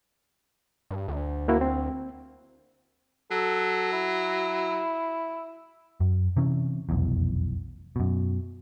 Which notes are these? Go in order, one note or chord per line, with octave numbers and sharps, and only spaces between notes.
G2
D2
A#3 E4 F#4
C4
F#3 A4
E4
F#2
C3 E3 C#4
F1 B1 E2
F#2 B2